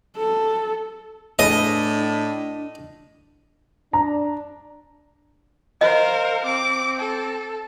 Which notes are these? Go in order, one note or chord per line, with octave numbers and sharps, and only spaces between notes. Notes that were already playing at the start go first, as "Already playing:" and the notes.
A4
A2 A3 D4 G#4 B4 D#5
D4 A#5
A#4 C5 D#5 F5
C4 D6
A4